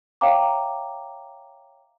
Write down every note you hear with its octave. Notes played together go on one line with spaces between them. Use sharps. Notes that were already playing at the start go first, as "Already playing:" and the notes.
C#5 E5 F5 G5 A#5 D6